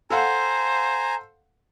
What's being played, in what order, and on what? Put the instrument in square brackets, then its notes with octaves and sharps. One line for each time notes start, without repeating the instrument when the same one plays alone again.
[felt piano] A4 F5 F#5 [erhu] C5 [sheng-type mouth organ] G#5 A#5